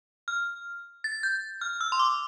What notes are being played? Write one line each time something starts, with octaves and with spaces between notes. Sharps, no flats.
F6
A6
G6
F6
E6
C6
D6